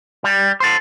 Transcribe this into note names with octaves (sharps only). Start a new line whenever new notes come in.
G3
A4 C5